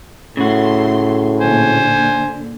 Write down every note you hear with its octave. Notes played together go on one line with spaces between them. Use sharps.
A2 C#3 A3 F#4 C6
A#2 D3 C5 G#5